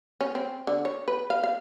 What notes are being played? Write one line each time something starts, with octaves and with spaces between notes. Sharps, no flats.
C#4
C4
D3
C#5
B4
F5
F5